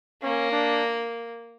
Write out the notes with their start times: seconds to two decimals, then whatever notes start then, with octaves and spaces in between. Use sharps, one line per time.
0.22 A#3 C#4
0.52 D4